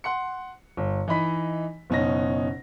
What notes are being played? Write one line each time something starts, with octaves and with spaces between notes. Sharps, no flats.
F#5 C6 C#7
G1
E3 D#4 D#5 B5 B6
F#1 B2 C#4 D#4 A#6